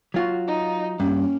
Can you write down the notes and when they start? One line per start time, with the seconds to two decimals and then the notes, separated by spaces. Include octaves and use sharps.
0.14 F#3 F4 F#4
0.48 D#4
1.00 G2 A#3 C#4